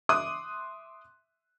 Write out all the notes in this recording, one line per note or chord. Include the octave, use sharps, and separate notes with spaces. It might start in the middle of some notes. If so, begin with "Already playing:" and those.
E5 C6 D6 D#6 F#6